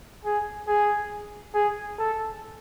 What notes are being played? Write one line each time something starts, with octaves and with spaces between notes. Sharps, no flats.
G#4
G#4
G#4
A4